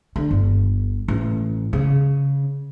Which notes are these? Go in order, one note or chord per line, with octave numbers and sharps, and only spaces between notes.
D3
G1
A1
C#3